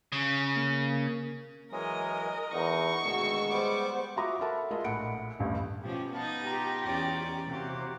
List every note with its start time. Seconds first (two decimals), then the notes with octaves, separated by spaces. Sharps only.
0.12 C#3
0.57 A#3
1.72 E3 F#3 G#3 A#4 D#5
2.53 E2 D#4 C#6
3.05 D2 B2 D#3 G#3 F#4 E6
3.50 G3 B3 C5 D6
4.16 F4 F#4 E5 A#5 D6 D#6
4.40 A4 A#4 E5 F#5 A5 B5
4.71 G#3 F4 G#4 A#4 D#5 E5
4.84 A#1 A2 F#5 B5 C#7 D7
5.39 D#1 A1 G2
5.82 B2 F3 C#4 G4
6.12 B3 D#4 F5 A5
6.45 F4 G4 A#5
6.86 E2 C#4 D5
7.50 C3 A#3 F#4 G4 C5